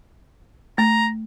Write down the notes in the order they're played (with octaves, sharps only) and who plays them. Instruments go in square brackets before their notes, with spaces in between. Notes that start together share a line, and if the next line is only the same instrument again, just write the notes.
[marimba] A3 [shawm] A#5